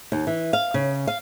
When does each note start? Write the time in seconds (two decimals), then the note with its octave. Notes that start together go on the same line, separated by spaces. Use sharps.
0.12 D#2
0.27 E3
0.53 F5
0.74 C#3
1.07 F5